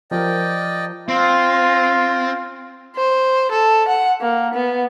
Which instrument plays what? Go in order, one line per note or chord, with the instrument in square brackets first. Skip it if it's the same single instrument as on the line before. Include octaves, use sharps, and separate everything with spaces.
[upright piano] F3 G4 A#4 [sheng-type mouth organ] D5 D#5 G5
[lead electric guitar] C4 [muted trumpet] F4
[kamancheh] C5
A4
F#5
A#3
B3